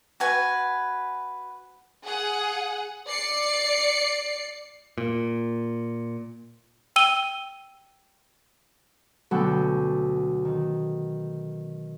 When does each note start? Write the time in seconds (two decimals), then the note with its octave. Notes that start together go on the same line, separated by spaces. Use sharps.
0.20 F#4 B4 G#5
2.05 G#4 F#5
3.07 D5 C7 C#7
4.98 A#2
6.96 G5 E6 D#7 G7
9.31 D2 B2 F#3 A4 F#5 G5
10.45 D#3